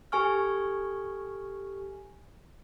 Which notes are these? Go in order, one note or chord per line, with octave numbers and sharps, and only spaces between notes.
G4 A4 G#5 C#6 F6